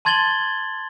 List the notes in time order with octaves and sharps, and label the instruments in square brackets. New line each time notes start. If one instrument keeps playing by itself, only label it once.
[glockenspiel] A5 C6 G#6 A6 F#7 G7